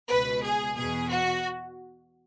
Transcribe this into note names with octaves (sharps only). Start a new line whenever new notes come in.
C#2 B2 B4
G#4
E2 B2 G#4
F#4